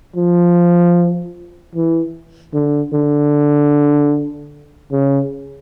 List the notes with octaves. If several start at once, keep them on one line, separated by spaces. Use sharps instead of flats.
F3
E3
D3
D3
C#3